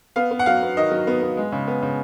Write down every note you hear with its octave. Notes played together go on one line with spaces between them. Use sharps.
B3 F5
B3
F#5
F#3 F5
B3
D#3 D#5
F#3
B3
B3
G#3
C#3
B3
C#3